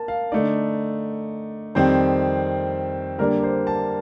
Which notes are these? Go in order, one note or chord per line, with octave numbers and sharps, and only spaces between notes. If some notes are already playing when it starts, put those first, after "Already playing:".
Already playing: A#3 A5
F5
D3 A3 D#4 D5
F2 D#3 G3 C4 C5
D3 G3 A#3 D4 A#4
C5
A5